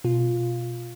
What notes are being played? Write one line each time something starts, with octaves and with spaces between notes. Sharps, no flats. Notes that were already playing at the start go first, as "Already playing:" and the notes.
B2 F4